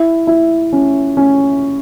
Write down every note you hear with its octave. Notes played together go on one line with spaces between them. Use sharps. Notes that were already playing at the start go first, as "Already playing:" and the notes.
Already playing: E4
E4
C#4
C#4